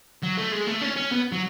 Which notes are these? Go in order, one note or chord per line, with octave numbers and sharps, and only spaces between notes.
F#3
A3
G#3
A3
C#4
C#4
B3
F#3